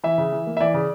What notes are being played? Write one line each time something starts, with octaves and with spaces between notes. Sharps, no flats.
E3 E5
C#3
E3
A#3
E5
E3 D5
C#3